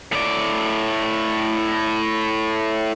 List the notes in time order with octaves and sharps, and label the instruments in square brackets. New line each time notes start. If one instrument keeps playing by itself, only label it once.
[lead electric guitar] A2 D5